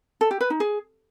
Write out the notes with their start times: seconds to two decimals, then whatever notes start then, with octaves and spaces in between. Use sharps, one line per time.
0.21 A4
0.31 G4
0.41 B4
0.50 D#4
0.60 G#4